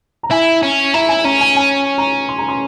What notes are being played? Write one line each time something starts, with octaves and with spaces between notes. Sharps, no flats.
A#5
E4 G#5
C#4
E4 A#5
G#5
C#4 A#5
G#5
G#5
A#5
C6
A#5
C6